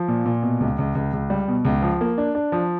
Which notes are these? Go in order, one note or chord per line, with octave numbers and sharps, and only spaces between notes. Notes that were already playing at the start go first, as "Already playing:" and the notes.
Already playing: F3
A#2
A#2
B2
C#2
C#2
C#2
C#2
G3
B2
C#2
F3
A#3
D4
D4
F3